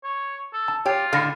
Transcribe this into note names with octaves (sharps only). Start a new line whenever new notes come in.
C#5
A4
A5
F4 G4 C#5 G5
A2 D3 F5 F6 A#6 C#7